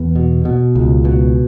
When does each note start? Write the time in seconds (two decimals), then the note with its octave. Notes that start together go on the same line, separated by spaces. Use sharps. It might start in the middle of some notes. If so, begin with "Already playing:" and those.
Already playing: E2 B3
0.16 B2
0.45 B2
0.75 C#2
1.05 B2